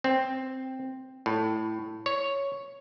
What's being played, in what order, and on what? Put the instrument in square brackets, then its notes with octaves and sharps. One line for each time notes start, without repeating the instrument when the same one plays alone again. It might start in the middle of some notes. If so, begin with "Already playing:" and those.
[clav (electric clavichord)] C4
A2
C#5